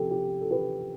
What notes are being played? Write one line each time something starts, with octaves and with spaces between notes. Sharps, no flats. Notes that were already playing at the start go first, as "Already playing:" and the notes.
Already playing: C3 F3 G4 A4
G4
A4
G4 B4